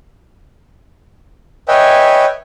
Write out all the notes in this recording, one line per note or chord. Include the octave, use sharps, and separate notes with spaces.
B4 C#5 D#5 E5 G5 G#5